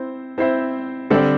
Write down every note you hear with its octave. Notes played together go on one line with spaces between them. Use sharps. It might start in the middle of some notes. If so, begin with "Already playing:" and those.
Already playing: C4 E4 C5
C4 E4 C5 E5
D3 G3 C4 A4 D5